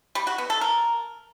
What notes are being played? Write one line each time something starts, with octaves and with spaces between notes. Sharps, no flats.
G3
F#4
B3
A4
A#4